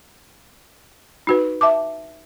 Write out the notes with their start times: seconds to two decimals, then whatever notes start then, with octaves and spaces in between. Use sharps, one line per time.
1.27 D#4 F#4 B4
1.61 E5 A5 D6